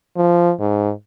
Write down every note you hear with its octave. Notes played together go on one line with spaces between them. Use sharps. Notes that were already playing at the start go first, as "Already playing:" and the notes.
F3
G#2